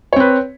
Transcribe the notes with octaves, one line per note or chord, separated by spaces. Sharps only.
C4 B4 C#5